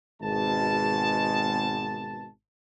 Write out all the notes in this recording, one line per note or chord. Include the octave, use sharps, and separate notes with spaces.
G#1 B2 G#3 A5